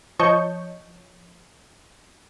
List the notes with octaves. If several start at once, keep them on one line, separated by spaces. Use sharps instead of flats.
F3 C#5 D#5 A5 C#6 G6